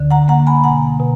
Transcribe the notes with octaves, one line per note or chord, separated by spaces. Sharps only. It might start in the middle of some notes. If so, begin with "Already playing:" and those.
Already playing: D2 D3
F#5 A#5
A#3 F#5 A#5
G#5 B5
B2 F#5 A#5
B2